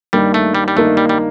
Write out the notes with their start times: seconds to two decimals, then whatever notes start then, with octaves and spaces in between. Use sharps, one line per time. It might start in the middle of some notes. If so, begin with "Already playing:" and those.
0.13 G2 D#3 G3 A#3 D#4
0.34 A3
0.55 G3
0.68 G3
0.76 G2 D#3 A3 A#3 D#4
0.97 G3
1.09 G3